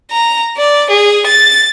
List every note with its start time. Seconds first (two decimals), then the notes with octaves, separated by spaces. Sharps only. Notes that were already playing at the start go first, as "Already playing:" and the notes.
0.12 A#5
0.57 D5
0.90 G#4
1.26 A6